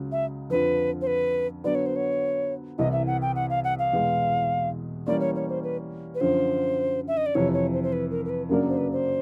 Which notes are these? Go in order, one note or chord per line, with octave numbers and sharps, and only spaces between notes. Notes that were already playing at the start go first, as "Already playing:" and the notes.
Already playing: C#2 C#3 F#3
E5
F2 D3 F3 B4
C5
B4
D3 F#3 B3 D5
C#5
C5
C#5
C2 C3 E3 D#5
E5
F#5
G5
F#5
F5
F#5
F5
E2 B2 G#3
E3 G3 A#3 C#4 D5
C#5
C#5
C5
B4
B4
F#2 D3 F3 C5
E5
D#5
D5
F2 C3 E3 C#5
C#5
C5
C5
B4
A#4
A#4
B4
F#2 C#3 F#3 A#3 D4 A#4
C5
B4
C5